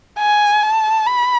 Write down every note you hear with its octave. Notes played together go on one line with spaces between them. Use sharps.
G#5
A5
B5